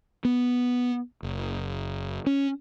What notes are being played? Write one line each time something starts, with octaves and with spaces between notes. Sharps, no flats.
B3
F#1
C#4